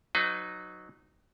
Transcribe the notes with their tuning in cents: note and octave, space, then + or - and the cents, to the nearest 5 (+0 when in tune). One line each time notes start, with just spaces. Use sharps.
F#3 +0 D#4 -15 B4 +35